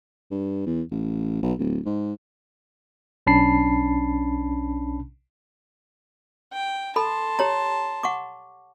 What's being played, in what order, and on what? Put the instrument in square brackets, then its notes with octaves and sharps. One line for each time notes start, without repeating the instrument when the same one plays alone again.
[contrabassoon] G2
E2
A1
B1
D1
G#2
[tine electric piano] B1 C#4 D4 A5 B5 C7
[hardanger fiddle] G5
[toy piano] A4 B5 [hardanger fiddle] A5 C6
[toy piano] G4 C#5 A#5
F#5 C#6 D6